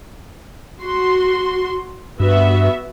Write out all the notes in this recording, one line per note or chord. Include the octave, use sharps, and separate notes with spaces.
F#4 C6
G2 B3 F#4 E5